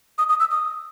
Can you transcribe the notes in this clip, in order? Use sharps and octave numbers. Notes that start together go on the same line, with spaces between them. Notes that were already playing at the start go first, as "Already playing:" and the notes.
D#6
D#6
E6
D#6